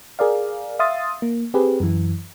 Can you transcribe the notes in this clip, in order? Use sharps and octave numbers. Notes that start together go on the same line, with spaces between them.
G#4 A#4 D5 F5
E5 F5 C6 D#6 A6
A#3
C4 G4 G#4 B4
F#2 E3